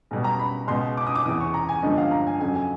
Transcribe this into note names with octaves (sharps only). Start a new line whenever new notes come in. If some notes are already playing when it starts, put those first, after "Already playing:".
B1 B2 G3
A#5
B5
C#2 B2 G#3 C6
D6
D#6
D6
E2 C3 E3 D#6
C#6
A#5
G#5
G1 G2 D3 F3 G#3 D#5
F5
A#5
G#5
F2 C#3 F#3 G#5
G#5